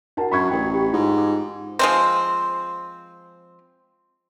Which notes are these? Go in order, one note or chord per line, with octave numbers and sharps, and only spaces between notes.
D4 F#4 A#4 F#5 A5
F#2 B5 C#6 G#6
A1 F#4 A#4 G5
G4 G5
G#2 F4
D6
F3 G#3 C4